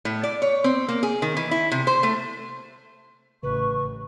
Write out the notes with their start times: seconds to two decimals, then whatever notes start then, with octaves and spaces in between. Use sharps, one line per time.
0.05 A2
0.23 D5
0.42 C#5
0.64 C4
0.88 A#3
1.03 G#4
1.22 D#3
1.37 E3
1.51 E4
1.72 C3
1.87 C5
2.03 A3
3.43 A1 C#3 B4 C#6